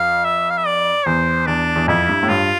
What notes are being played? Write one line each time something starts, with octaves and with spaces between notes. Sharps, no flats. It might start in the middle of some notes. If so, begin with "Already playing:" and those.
Already playing: F2 F5
E5
F5
E5
D5
E2 C5
E2 D4
E2
F2 E4
G2
A2
G2 F4